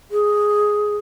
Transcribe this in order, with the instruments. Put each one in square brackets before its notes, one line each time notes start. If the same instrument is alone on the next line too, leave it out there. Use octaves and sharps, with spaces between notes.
[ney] G#4